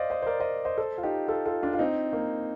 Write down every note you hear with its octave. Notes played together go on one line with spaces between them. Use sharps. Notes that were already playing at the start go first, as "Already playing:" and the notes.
Already playing: C5 D5 D#5 F5
C5 D#5
C5
A#4 D5
C5 D#5
C5 D#5
A4 C5
F4
D#4 G4
F4 A4
F4 A4
D4 F4
F4
C4 D#4
A#3